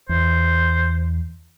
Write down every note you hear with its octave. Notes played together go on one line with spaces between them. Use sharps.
E2 C5